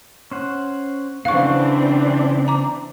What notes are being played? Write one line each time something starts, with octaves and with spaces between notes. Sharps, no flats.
C#4 C5 F#5
C#3 E3 C4 D4 F5 F#5 C#6
A#5 D6